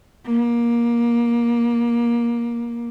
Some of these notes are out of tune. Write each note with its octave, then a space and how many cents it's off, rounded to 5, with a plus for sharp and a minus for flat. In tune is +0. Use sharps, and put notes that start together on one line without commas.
A#3 +20